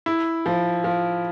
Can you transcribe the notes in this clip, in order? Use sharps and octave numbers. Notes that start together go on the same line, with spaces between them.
E4
F3
F3